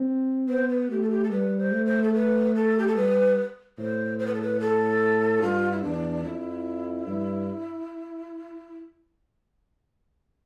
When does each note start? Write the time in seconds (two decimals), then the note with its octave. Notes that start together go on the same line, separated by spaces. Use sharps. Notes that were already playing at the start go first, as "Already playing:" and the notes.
Already playing: C4
0.48 B3 C5
0.69 B4
0.89 A3 G4
1.02 A4
1.10 G4
1.24 A4
1.31 G3 B4
1.58 C5
1.72 A3
1.86 C5
2.03 A4
2.13 B4
2.55 A4
2.78 G4
2.87 A4
2.96 G3 B4
3.78 A2 C5
4.19 C5
4.27 B4
4.34 A4
4.41 B4
4.60 A4
5.42 G2 F4
5.71 E4
5.83 E2 D4
6.24 F2 E4
7.06 G2